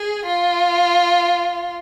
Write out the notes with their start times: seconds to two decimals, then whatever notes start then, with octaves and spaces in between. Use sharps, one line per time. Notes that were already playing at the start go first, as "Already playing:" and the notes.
Already playing: G#4
0.25 F4